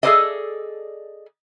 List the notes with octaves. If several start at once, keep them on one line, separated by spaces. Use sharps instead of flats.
G#4 A4 B4 C5 D5 D#5